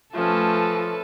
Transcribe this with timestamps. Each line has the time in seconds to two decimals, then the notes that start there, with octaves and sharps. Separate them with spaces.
0.15 F3 A3 C#4 A4 B4